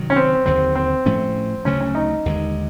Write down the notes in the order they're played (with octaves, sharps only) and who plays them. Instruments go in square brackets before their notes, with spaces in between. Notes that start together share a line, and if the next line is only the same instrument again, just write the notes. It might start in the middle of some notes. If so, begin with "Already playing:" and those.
Already playing: [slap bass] C3 D#3 F#3
[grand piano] C#4
C4
[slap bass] D#2 D3 F#3 [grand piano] C4
[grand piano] C4
[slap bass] A2 F3 A3 C#4
[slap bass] D2 C#3 F#3 A3 [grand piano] C#4
[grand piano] C#4
D#4
[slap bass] D#2 D3 F3 G#3